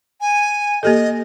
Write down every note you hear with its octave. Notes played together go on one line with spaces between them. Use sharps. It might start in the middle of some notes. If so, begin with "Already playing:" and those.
G#5
A#3 G4 A4 D#5